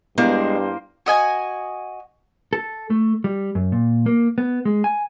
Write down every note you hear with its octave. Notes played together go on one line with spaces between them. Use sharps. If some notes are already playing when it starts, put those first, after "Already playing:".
G2 G#3 A#3 B3 E4 C5
F#4 D#5 G#5
A4
A3
G3
F#2
A#2
A#3
B3
G#3
G#5